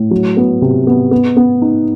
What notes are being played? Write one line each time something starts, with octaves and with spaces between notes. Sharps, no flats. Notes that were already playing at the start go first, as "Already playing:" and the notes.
Already playing: A2
F#3
B3
C3
B3
B3
B3
D#4